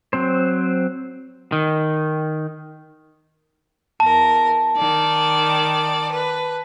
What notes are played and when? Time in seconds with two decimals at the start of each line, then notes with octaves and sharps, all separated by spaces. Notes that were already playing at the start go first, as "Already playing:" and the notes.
0.13 F#3 C4 C5
1.52 D#3
4.00 E2 A#4 A5
4.76 D#3 D5
6.11 B4